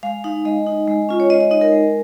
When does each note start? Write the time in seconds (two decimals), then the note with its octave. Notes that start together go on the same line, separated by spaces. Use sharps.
0.03 G#3 F5
0.24 D#4 F5
0.45 G#3 D#5
0.66 D#4
0.88 G#3
1.09 C#4 F4
1.20 C#5
1.30 G#3 D#5
1.40 D#5
1.51 D#4 D#5
1.61 A#4
1.72 G#3